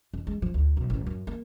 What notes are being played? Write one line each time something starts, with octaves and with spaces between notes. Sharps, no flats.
F2
G#3
F3
D2
B1
A1
F#2
A#3